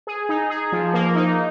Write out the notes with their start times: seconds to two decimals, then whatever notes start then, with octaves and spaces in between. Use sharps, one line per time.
0.07 G#4
0.29 D#4
0.50 G#4
0.72 F3
0.93 A#3
1.15 D#4